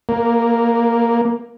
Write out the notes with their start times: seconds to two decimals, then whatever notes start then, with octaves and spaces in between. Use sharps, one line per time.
0.09 A#3